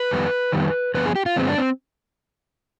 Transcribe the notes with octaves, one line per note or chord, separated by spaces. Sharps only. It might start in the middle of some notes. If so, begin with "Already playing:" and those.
Already playing: B4
F2 D#3 G3 B3
F2 D#3 G3 B3
G2 D3 F3 B3 B4
G#4
G4
F4
G2 D3 F3 G#3 B3 C4
D4
C4